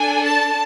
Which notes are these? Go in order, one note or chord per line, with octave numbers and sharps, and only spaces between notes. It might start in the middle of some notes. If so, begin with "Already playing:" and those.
Already playing: D4 A4 G#5
A5